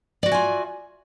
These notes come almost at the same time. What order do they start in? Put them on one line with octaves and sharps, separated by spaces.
D5 F#4 E5 G#5 F4